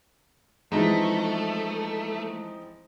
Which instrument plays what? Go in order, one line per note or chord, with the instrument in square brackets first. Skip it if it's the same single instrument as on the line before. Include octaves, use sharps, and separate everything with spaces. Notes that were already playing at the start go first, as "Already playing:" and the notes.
[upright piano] E3 G#3 [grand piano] F3 C4 D#4 [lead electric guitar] A3